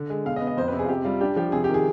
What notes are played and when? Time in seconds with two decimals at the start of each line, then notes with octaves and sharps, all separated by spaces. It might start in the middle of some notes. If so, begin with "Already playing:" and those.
Already playing: D3
0.10 G#3
0.25 B2 F5
0.36 D#5
0.41 B3
0.47 D#5
0.57 F2 C5
0.68 B4
0.73 C3
0.79 G#4
0.85 F4
0.89 C3 G4
1.04 G3 F4
1.21 D4 G4
1.36 F3 G4
1.52 C3 G#4
1.64 G4
1.69 D#3 G#4